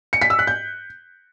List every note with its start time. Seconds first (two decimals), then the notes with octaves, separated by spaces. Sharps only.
0.13 C#7
0.21 B6
0.30 E6
0.39 F#6
0.47 G6